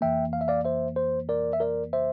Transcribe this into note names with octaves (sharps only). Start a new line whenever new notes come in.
F2 E3 A#3 E5 G5
F5
E5
D5 F5
C5 E5
C5
A#4 D5
E5
A#4 D5
C5 E5